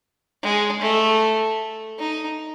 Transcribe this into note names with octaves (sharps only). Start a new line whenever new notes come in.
G#3
A3
D#4